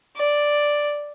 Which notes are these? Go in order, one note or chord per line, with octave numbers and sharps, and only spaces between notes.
D5